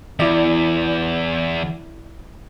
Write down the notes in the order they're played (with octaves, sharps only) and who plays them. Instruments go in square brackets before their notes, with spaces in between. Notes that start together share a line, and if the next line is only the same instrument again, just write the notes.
[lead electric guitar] E2 [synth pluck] E4 D5